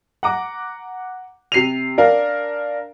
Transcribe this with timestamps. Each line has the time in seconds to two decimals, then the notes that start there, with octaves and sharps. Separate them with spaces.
0.23 F#5 A#5 D6
1.52 C3 C7 D#7 F7
1.98 D4 A#4 F5